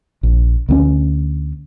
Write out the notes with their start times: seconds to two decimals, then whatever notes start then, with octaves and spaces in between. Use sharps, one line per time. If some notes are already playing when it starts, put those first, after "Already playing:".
0.23 A#1
0.69 D2 A3 C#4